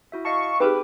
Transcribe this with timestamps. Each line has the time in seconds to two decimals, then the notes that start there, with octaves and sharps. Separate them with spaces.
0.12 E4 F#4 E5
0.25 D#5 F5 A5 C#6
0.60 C4 D#4 G4 G#4 B4 G5 D6